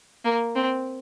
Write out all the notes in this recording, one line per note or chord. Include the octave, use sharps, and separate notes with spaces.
A#3
C4